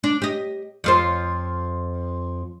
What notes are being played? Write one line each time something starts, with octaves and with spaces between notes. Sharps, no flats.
D4
G4 D#5
F2 F4 C5